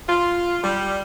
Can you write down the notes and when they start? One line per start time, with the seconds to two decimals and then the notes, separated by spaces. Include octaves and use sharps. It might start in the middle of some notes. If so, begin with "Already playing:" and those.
0.08 F4
0.63 G3